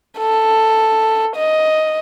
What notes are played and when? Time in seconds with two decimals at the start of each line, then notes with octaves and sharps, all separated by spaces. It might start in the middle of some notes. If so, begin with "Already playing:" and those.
0.19 A4
1.36 D#5